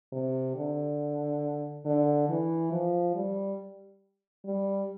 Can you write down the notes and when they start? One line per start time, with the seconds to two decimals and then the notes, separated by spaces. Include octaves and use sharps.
0.13 C3
0.56 D3
1.85 D3
2.29 E3
2.72 F3
3.15 G3
4.45 G3